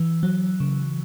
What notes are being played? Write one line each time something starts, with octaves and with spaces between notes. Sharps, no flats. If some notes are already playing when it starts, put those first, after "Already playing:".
Already playing: E3
F#3
C#3